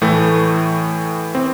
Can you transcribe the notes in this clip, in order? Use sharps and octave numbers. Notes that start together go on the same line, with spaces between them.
A2 E3 A3
C4